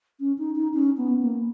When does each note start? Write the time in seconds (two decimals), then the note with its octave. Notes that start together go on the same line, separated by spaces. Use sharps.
0.20 C#4
0.38 D#4
0.56 D#4
0.74 C#4
0.97 B3
1.21 A#3